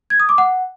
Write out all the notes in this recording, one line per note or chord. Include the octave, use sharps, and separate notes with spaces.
G#6
D#6
D6
F#5